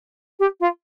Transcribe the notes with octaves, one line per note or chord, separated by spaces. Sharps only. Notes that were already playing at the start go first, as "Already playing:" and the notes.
G4
F4